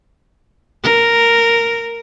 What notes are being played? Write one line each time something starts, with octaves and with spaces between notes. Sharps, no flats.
A#4